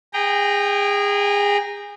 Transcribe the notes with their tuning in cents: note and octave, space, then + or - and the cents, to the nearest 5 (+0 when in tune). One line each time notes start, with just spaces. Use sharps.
G#4 -30 G5 +0 A#5 +0